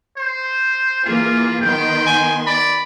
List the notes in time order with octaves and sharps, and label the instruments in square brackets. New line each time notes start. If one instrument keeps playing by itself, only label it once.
[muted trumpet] C5
[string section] E3 A#3 G#4 [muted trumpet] F4
[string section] D#3 B3 C6 [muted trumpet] G5
[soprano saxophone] G#5
[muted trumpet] D5 [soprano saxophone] B5